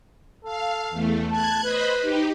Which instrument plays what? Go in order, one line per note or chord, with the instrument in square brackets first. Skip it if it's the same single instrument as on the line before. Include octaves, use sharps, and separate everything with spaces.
[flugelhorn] A4 [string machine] F5
[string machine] E2 A3
[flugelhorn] A5 [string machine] F#6 G#6
[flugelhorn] B4 [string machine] C5 D#5 B5
[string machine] D#4 G4